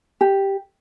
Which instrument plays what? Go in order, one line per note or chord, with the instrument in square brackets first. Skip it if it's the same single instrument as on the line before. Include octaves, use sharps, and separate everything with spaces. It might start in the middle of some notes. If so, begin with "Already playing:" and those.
[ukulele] G4